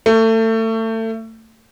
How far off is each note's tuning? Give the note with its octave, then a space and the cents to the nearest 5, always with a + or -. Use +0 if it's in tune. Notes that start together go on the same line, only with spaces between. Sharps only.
A3 +30